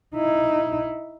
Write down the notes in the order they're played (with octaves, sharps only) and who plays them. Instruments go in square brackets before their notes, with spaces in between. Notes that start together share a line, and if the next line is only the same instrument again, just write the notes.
[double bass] D#4 E4